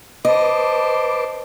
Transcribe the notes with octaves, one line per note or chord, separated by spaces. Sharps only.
B4 C5 D#5 A5 D6